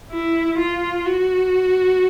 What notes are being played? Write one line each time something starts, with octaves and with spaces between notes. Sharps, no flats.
E4
F4
F#4